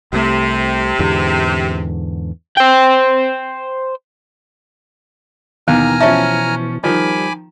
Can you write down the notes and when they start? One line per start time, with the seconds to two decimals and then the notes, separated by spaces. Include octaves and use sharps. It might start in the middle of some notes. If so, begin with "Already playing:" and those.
0.13 C2 C3 A3
0.99 E2 G#2 D3
2.57 C5 G5
5.68 D#2 B2 E3 B3 G#5 A#5 F6
6.01 F3 C#4 E5 A5
6.84 D#3 F3 G3 G#5 B5 D6